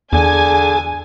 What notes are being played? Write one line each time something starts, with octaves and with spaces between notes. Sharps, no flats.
E2 D3 G#4 G#5 A5